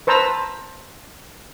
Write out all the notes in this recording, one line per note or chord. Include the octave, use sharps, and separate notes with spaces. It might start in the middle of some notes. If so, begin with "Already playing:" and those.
B4 C5 A5 A#5 E6